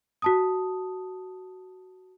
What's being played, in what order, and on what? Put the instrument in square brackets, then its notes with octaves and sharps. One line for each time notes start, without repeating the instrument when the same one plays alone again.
[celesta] F#4 A5 D#6